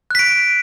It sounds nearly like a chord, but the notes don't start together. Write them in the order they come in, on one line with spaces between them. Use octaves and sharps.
F#6 B6 D7